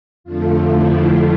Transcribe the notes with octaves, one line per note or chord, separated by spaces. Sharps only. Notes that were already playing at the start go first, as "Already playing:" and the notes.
F2 D3 F3 A3 F4
E4